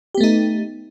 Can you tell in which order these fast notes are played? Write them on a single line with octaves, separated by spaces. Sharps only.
G4 B3 A3 D#4